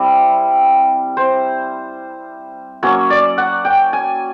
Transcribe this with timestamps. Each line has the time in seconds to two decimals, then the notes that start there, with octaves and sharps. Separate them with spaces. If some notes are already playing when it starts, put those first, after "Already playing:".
Already playing: G3 C4 E4
1.17 C5
2.83 F#3 A#3 C#4 C#5
3.10 D5
3.38 F#5
3.65 G5
3.93 G#5